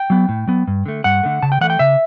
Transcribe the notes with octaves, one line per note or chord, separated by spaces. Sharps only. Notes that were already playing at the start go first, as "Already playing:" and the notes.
Already playing: G5
F#3 B3
A2
F#3 B3
G2
D3 A3
G2 F#5
D3 A3
C#3 A5
G5
E3 A3 F#5
G5
C#3 E5